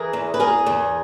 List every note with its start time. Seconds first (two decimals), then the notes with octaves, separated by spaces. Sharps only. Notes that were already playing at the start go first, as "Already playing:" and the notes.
Already playing: E3 G#4 A#4
0.13 E2
0.34 B4
0.40 E2 G#4 A#4
0.66 E2